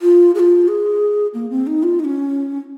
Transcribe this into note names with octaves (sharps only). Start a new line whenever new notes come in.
F4
G#4
F4
G#4
A#3
C4
D#4
F4
D#4
C#4